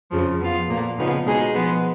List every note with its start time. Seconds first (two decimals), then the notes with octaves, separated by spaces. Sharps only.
0.10 F2 C#3 F3
0.39 F3 B3 F4
0.68 A#2 F3 A#3
0.97 C#3 F3 B3 D#4
1.26 B2 G#3 D#4 G#4
1.54 F3 G#3 B3